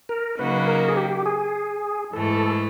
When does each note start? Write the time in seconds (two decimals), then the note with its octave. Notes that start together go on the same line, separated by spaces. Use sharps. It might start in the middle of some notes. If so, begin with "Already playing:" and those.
0.09 A#4
0.38 C#3 F#3 A#3 D#4 F#4 B4
0.68 A#4
0.88 G#4
0.96 G4
1.26 G#4
2.13 G#2 E3 A3 A4
2.35 A4